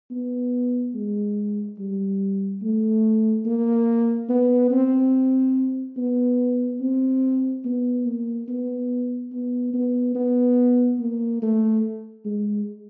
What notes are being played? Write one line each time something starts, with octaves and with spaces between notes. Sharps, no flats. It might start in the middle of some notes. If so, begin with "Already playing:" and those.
B3
G#3
G3
A3
A#3
B3
C4
B3
C4
B3
A#3
B3
B3
B3
B3
A#3
A3
G#3